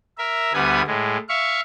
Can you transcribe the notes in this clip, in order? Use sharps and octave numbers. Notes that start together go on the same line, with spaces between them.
A#4 E5
D2 G3 B3 B4 G#5 D#6
A2 G#3
E5 F5 C#6